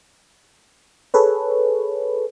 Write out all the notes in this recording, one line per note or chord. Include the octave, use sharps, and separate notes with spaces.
G#4 A4 B4 C#5